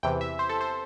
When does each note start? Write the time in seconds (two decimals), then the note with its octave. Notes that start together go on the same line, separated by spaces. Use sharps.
0.03 E2 C3 E3 G5
0.21 E5
0.39 C5
0.49 A4
0.61 C5